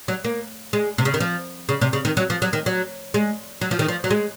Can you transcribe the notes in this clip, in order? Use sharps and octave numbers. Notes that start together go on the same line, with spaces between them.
F#3
A#3
G#3
C3
C#3
D#3
F3
C#3
C3
C#3
D#3
F#3
F3
F#3
D#3
F#3
G#3
F#3
F3
D#3
F3
F#3
G#3